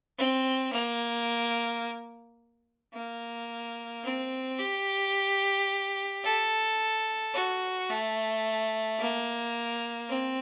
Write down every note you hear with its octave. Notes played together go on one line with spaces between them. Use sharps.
C4
A#3
A#3
C4
G4
A4
F#4
A3
A#3
C4